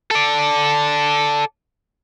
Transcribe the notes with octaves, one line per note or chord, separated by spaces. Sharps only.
A4 D5